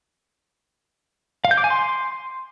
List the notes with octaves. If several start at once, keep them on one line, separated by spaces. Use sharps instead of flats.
F5
G6
D6
G#5
C6